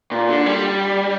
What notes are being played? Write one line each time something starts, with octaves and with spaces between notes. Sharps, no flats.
A#2
D3
G3